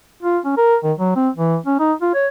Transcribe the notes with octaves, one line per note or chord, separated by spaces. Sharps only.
F4
C#4
A#4
D#3
F#3
C4
E3
C#4
D#4
F4
C#5